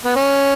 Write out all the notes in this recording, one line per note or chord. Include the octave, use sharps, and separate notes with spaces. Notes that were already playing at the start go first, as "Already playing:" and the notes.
B3
C#4